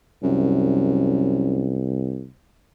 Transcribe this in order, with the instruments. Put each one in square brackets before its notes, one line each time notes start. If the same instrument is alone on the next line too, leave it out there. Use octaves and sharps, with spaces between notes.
[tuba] C2 [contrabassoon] F#2